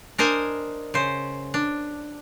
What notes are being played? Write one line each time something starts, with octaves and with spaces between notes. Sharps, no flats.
D4 A#4 C5 D#5 G#5
C#3 C5
D4